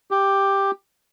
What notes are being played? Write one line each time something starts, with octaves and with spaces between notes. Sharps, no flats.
G4